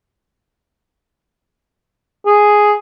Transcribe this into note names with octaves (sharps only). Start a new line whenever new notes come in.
G#4